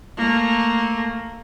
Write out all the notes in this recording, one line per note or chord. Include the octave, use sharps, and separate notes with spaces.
A3 A#3